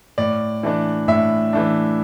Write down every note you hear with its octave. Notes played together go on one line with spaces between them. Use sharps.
A2 D5
E3 A3 D4
A2 E5
E3 A3 D4